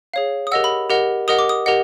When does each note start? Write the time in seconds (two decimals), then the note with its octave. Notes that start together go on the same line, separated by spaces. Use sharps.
0.14 G#4 C#5 F5
0.47 D#6
0.52 G4 A#4 D#5 F#5 E6
0.64 B5
0.90 G4 A#4 D#5 F#5
1.28 G4 A#4 D#5 F#5 D#6
1.39 D6
1.49 D#6
1.66 G4 A#4 D#5 F#5